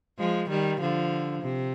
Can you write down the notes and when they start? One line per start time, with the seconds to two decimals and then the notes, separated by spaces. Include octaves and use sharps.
0.19 F3 G#3
0.49 D#3 G3
0.80 D3 F3
1.42 C3